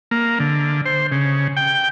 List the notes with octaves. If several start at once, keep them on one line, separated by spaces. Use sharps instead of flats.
A#3
D3
C5
C#3
G5